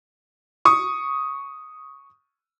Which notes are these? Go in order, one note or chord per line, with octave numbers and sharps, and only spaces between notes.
C#6 D#6